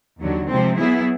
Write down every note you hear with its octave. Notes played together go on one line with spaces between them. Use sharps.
D#2 D3 F#3
C3 F3 G#3 C4
F#3 B3 E4 G#4